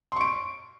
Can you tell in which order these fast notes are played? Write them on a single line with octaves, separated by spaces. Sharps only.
C6 C#6 D7